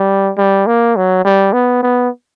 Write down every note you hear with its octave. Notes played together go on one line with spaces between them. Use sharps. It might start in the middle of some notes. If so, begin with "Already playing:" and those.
Already playing: G3
G3
A#3
F#3
G3
B3
B3